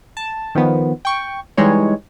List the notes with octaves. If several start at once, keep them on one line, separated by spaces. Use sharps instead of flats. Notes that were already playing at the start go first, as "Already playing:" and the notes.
A5
D#3 F3 B3
G5 C#6
E3 G3 G#3 D#4 C#5